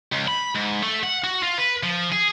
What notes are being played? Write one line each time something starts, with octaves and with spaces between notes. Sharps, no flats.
C#2
B5
G#2
A3
F#5
F#4
F4
B4
F3
G#4